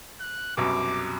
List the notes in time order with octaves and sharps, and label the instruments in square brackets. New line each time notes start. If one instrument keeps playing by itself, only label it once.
[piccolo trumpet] F#6
[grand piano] C2 F#2 B2 [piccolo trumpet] D6